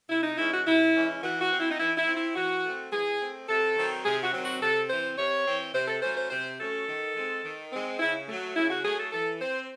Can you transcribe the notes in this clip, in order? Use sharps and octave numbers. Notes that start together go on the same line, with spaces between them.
C3 E4
D#4
E3 G#3 C#4 E4
F#4
C3 E4
E3 G#3 C#4
E3 F#4
F#4
C4
E4
D#4
E3 E4
E4
C4
E4
E3 F#4
A3 C4
E3 G#4
A3 C4
C3 A4
D#3 F#3 C4
C3 G#4
F#4
D#3 F#3 C4
F#4
C3 A4
E3 C4 C5
C3 C#5
E3 C4
C3 C5
A4
F#3 A3 C#4 C5
C5
C3 C5
F#3 A3 C#4 A4
D#3
G#3 C4
D#3
G#3 C4
C#3 E4
F#3 A3
C#3 E4
F#4
F#3 A3 G#4
A4
E3 A4
C4 C5